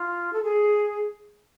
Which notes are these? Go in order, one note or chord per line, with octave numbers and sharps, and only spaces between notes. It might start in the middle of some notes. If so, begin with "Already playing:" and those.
Already playing: F4
A4
G#4